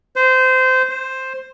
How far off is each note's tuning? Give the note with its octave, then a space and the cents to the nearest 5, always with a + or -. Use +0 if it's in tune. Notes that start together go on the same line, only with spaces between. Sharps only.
C5 -20
C5 +5